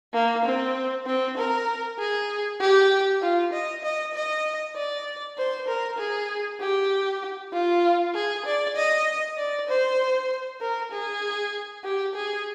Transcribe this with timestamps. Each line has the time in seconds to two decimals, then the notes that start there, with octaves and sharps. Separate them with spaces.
0.14 A#3
0.45 C4
1.07 C4
1.37 A#4
1.99 G#4
2.61 G4
3.22 F4
3.53 D#5
3.84 D#5
4.14 D#5
4.76 D5
5.38 C5
5.68 A#4
5.99 G#4
6.61 G4
7.53 F4
8.15 G#4
8.46 D5
8.77 D#5
9.38 D5
9.69 C5
10.61 A#4
10.92 G#4
11.84 G4
12.15 G#4